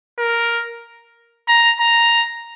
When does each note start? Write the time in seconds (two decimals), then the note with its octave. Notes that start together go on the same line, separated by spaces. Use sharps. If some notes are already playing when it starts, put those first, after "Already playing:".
0.19 A#4
1.49 A#5
1.80 A#5